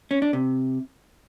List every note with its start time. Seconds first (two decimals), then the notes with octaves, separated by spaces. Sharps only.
0.11 C#4
0.22 D4
0.33 C3